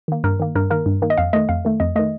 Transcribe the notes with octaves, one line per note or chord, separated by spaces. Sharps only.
D#3 A#3
G2 A#4
D#3 A#3
G2 A#4
D#3 A#3 A#4
G2
D#3 A#3
D#5
F2 F5
D#3 A3 D#5
F2 F5
D#3 A3
F2 D#5
D#3 A3 D#5